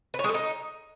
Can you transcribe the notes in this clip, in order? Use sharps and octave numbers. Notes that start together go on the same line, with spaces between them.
B4
C#5
G#3
A4
D#4